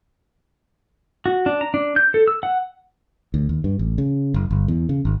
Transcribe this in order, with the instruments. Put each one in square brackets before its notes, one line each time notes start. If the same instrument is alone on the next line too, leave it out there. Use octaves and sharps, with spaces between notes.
[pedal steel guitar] F#4
D4
A#5
D4
G6
A4
E6
F#5
[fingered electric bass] D2
D#2
G2
A1
C#3
F#1
G1
E2
C#3
G#1